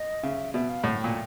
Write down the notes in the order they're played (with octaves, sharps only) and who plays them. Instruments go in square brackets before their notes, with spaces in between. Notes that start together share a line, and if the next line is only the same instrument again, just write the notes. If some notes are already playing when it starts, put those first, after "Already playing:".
Already playing: [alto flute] D#5
[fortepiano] C#3 [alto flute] E5
[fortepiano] B2 [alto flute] E5
[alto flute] F5
[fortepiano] A2 [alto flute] F#5
[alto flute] G5
[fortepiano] A#2